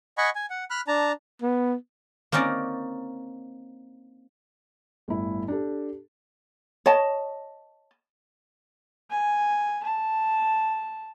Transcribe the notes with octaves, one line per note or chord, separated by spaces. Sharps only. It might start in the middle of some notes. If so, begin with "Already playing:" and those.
D#5 F#5 G#5 B5 C#6
G#5
F#5
B5 F6 F#6
D4 A5 A#5
B3
A#3 C4 C#4 D#4 D5
G1 A2 E4
D4 G4 A4
C#5 D#5 A5
G#5
A5